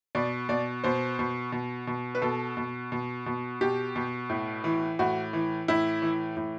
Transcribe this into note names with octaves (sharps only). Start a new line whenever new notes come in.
B2 D5
B2 D5
B2 C5
B2
B2
B2
B4
B2 A4
B2
B2
B2
B2 G4
B2
A2
E3
A2 F#4
E3
A2 E4
E3
A2